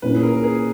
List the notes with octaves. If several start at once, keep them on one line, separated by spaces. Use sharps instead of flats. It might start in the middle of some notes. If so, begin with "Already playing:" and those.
A#2 A#3 C#4 E4 B4
G#4
A#4
A#4
G#4